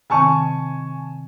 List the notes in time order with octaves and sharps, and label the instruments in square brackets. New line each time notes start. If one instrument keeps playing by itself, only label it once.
[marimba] C3 D#3 C4 [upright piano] G#5 A5 C#6